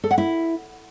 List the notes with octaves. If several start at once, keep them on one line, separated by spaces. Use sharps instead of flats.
A4
F#5
E4